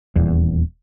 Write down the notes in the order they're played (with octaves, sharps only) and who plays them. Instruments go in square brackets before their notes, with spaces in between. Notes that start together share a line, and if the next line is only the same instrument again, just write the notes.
[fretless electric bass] D#1 E2